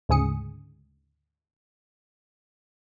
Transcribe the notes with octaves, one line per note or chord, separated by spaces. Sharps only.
D2 G#2 C#3 G#4 D#6 C#7